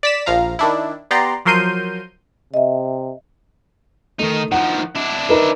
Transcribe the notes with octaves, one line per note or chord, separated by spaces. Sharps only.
D5 B6 E7
A#1 F3 F5 A#5
D#3 D4 E4
B3 G4 D5 A#5 C6
F3 F#3 A#4 C6 G6 D#7
C3 D#5 E5
D#3 A3 D#4
D#3 F3 F#5
D4 E4
D#4 A#4 B4